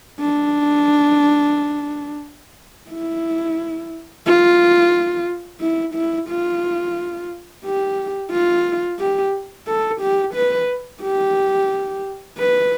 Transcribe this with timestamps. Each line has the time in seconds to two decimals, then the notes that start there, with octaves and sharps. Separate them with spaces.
0.20 D4
2.91 E4
4.26 F4
5.61 E4
5.95 E4
6.29 F4
7.65 G4
8.32 F4
8.99 G4
9.68 A4
10.01 G4
10.35 B4
11.02 G4
12.38 B4